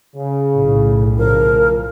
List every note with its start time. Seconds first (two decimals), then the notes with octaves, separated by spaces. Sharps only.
0.15 C#3
0.53 B1 A2
1.18 C#3 F3 A#4